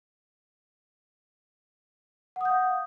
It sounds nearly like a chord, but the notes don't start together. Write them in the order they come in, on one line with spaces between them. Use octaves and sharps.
F#5 D#6 G6 F5